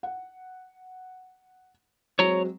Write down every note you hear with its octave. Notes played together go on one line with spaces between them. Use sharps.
F#5
F#3 G#3 C4 C#5 A#5